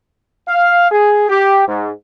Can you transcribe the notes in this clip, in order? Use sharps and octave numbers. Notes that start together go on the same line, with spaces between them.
F5
G#4
G4
G#2